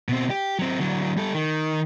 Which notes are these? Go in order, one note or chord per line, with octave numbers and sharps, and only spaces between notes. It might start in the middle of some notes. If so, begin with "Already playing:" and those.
B2 C4
G4
F#3 C4
D3 F#3
G3 A4
D#3